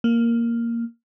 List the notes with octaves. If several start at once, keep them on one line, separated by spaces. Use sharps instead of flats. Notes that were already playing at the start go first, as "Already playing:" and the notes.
A#3